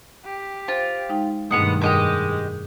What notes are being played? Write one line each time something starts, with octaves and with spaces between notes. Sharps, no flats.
G4
F4 C5
G#3 D#4 G5
G2 B2 D#3 G#3 A3 B3 F#5 D#6
F2 G#3 G4 A#4 D#5 F#5 D6